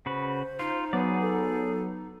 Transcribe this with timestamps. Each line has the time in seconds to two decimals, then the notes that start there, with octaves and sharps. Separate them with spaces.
0.06 C#3 F#4 B4 C5
0.59 D#4 F4
0.93 F#3 B3 G#4 D5
1.21 A4